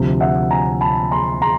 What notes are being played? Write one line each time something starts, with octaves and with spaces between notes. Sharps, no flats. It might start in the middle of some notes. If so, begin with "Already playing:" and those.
Already playing: D2 C3 F3
E5 F#5
G#5 A#5
A5 B5
A#5 C6
A#5 C6